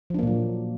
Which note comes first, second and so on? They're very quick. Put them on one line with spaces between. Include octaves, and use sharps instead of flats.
F3 D4 A#3 A#2 F#3